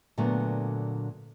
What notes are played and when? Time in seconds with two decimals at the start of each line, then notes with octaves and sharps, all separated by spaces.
0.18 A#2 D3 F#3 A3 B3